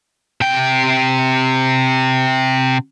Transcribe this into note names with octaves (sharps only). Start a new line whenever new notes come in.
C3 G5